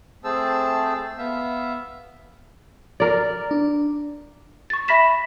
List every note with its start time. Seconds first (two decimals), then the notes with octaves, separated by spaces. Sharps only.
0.24 A3 C4 G#4 C5 A5 E6
1.18 B3 E5 F5
3.00 A#4 D5
3.51 D4
4.70 C#6 A6
4.88 E5 B5 A#6 B6 E7